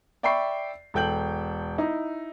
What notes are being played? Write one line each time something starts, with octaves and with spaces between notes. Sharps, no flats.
D5 E5 G5 B5 C#6 C7
E1 A4 G5 G6 F#7
D#4 E4